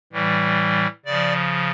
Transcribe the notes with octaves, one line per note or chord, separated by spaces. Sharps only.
A2 E3 G3
C#3 F3 D5